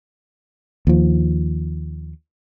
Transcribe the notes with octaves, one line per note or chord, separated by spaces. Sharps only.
D#2 F3